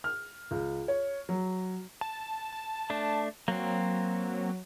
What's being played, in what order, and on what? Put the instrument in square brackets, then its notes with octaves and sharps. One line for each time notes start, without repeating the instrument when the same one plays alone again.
[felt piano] F6
C#2
C#5
F#3
[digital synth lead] A5
A5
[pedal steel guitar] A3 D4
[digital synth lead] F#3 [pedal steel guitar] A#3 C4